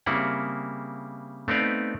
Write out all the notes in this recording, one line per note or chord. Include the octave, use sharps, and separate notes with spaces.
C#3 G3 A#3 C4 E4 F#5
A3 B3 C4 D#4 D5 F5